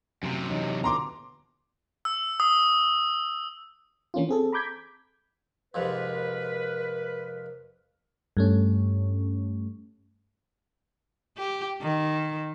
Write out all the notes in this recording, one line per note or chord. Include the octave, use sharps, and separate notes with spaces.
F#2 C3
E3 C#4 D#4
A#2 D3 B3 A#5 C6 D6
E6
D#6
E3 A#3 C#4 D4 F4
C4 G#4 A4
A#5 B5 D6 G6 G#6 B6
F2 G#2 C3 A#4 B4
G2 A3 C#4
G4
D#3